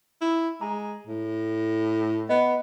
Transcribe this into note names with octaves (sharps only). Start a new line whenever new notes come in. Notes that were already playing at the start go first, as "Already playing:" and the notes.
E4
G#3 G#4 A#5
A2
B3 D#5